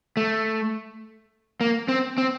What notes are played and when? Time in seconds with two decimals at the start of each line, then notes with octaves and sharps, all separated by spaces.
0.17 A3
1.61 A#3
1.88 C4
2.18 C4